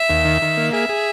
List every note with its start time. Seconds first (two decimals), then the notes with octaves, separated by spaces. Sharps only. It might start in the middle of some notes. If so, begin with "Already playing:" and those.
Already playing: E5
0.10 D#2
0.25 D#3
0.42 D#3
0.57 A#3
0.73 G#4 E5
0.89 G#4